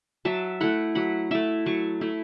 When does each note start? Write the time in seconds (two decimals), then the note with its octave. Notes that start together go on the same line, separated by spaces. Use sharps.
0.25 F#3 E5 A5
0.61 A3 E4 F#5 B5
0.95 F#3 F#5 B5
1.31 A3 E4 E5 A5
1.66 F#3 A5 C#6
2.01 A3 E4